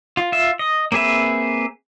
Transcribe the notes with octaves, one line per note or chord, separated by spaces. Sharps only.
F4
F4 E5
D#5
A#3 C4 G#4 B4 E5